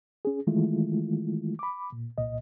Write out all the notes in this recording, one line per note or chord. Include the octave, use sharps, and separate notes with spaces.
C#4 G#4
D#3 E3 G#3 A3 E4 F4
B5 D6
A#2
C2 A#2 D#5